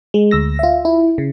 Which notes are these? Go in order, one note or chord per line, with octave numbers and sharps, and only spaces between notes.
G#3
D2 E6 A#6
F4 E5
E4
C#3